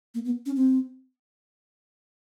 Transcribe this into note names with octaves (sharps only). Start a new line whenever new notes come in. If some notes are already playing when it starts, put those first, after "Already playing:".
A#3
B3
C#4
C4